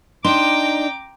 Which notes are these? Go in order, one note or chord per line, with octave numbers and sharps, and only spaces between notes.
D4 D#4 G5 A#5 C6 D6